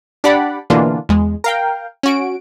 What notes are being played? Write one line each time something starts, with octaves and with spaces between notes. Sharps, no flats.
D4 G4 D5 F#5 B5
B2 D3 E3 A#3 D4 F4
E2 G#3
A#4 F5 G5
C#4 F#4 D7